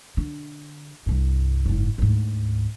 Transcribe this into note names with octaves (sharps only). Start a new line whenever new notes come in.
D3
C2 G2
F#1 G#2
D2 G#2